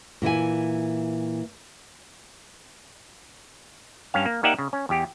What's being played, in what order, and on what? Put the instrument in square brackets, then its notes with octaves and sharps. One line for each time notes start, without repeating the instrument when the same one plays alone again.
[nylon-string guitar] A#2 E3 E4 G#5
[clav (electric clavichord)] G2 C#4 F5
A#3
A#3 D#4 G4 D5 E5 F#5
C#3
C#4
E2 G4